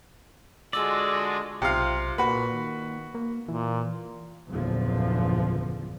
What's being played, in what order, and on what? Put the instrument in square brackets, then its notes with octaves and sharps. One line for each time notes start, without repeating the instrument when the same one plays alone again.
[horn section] D3 G#3 [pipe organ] F4 F#4 [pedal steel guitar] D5 [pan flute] E6
[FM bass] B1 [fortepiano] C3 F5 [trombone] F4
[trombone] A#2 [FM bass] A#3 [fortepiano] F#4 B4
[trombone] D#3
[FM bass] A#3
[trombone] A#2 [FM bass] E3
[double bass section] F#1 E2 G2 A#2 D3 F3